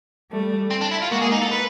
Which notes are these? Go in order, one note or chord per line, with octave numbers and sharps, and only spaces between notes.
G3 A3
C4
D4
E4
F4
G#3 A#3 F#4
G#4
D#4
A4
B4